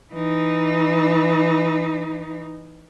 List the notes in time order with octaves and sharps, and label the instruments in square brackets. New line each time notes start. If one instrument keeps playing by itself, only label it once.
[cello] E3 D#4